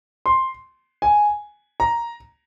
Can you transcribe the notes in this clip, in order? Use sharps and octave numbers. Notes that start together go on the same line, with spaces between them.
C6
G#5
A#5